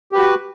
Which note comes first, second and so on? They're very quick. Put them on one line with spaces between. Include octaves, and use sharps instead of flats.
G4 B4 F#4